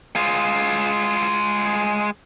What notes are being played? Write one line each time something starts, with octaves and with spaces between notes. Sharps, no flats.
G#3 F4